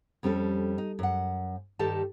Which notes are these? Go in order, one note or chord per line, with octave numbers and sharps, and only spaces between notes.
F2 G3 C#4 G#4 A4
D#4
F#2 F#5
G2 D#3 G3 G4 A4 A5